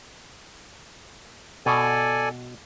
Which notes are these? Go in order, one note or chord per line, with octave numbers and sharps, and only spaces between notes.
B2 A4 D5 G#5